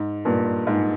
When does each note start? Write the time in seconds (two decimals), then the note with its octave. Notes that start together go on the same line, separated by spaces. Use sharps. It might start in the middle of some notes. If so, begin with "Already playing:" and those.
Already playing: G#2
0.25 G2 A#2
0.67 G#2